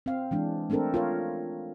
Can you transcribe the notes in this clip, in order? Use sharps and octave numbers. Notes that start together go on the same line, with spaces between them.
C4 F5
E3 G#3 D4
A3 C4 D4 A4 A#4
F4 A#4 C#5